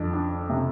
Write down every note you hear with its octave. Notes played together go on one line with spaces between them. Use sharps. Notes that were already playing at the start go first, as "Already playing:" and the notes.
Already playing: F2 D4
D4
C3